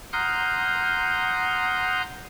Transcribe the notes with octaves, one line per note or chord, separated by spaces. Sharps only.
F#5 A#5 C6 D#6 F6 G6